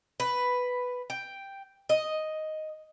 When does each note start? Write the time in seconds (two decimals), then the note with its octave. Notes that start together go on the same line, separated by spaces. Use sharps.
0.20 B4
1.10 G5
1.89 D#5